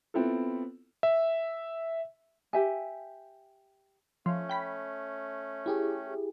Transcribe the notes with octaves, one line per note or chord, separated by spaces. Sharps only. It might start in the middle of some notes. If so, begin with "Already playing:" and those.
B3 C4 E4 F4 A4
E5
G4 E5 G#5
F3 A3 C#4
G5 B5 B6
E4 G4 G#4